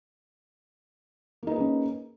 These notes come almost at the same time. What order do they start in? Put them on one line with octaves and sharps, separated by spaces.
A#3 D#4 B4 G#4 C#4